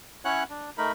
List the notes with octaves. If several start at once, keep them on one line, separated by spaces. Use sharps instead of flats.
C#4 E4 C#5 F#5 F#6
D4
A3 D#4 A#4 B5